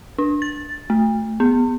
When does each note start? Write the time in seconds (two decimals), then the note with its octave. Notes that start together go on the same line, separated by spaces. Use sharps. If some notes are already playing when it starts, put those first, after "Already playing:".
0.18 D4
0.42 A6
0.90 A3
1.40 B3